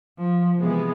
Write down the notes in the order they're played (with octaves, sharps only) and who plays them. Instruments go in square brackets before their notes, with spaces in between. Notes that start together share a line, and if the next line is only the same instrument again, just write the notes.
[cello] F3
[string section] C3 E3 G#3 B3